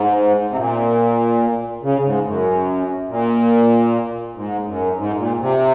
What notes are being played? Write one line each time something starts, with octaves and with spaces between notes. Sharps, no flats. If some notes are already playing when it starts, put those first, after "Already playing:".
Already playing: G#2
C3
A#2
C#3
G#2
F#2
A#2
G#2
F#2
G#2
A#2
C3